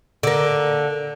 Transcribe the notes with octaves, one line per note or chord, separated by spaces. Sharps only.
D3 A#3